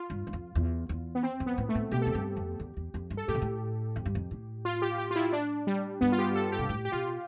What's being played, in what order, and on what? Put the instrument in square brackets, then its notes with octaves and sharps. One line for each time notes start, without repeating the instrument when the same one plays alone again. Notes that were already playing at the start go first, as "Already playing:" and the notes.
Already playing: [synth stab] F4
[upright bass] G2
G2
F2
E2
E2
[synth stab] B3
C4
[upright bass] F2
[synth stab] B3
[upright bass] A2
[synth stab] A3
[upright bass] A2
[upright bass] B2 [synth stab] G4
[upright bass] F2 [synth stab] A4
[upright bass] G2 [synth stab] G4
[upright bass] F2
E2
E2
F2
G2
[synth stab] A4
[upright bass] A2 [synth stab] G4
[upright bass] B2
A2
F2
G2
F2
A2
[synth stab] F4
G4
G4
F4
E4
D4
G3
[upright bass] G2 [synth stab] B3
[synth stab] F4
G4
A4
G4
[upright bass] B2
[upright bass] A2 [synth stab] G4
[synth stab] G4
[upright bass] B2 [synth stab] F4